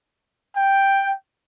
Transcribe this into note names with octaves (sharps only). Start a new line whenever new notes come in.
G5